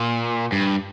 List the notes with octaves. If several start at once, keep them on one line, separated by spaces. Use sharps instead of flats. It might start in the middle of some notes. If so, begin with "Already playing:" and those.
Already playing: A#2
G2